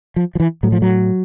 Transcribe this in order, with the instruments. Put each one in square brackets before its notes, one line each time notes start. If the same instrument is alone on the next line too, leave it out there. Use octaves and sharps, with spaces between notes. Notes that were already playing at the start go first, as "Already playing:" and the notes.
[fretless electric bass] F3
F3
E3
A2 F#3
F3
F#3